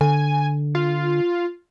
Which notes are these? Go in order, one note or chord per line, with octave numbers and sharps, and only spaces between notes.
D3 G#5
F4